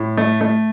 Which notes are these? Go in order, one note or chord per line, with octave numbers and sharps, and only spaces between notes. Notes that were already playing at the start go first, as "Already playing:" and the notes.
Already playing: A2
A3
A3